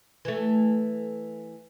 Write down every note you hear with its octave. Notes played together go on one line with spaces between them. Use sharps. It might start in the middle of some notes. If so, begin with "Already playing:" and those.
E3 A3